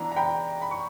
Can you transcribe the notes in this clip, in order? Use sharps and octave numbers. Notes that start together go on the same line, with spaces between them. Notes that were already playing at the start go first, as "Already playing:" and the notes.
Already playing: E3 B3 D4 A#5
A#5
G5 B5
B5
C#6